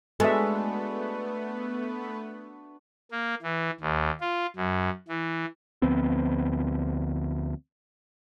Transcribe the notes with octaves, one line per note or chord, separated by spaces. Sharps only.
G#3 A3 B3 D4 F#4 A4 B4 E5
A#3
E3
D#2
F4
F#2
E3
D2 F3 B3 C4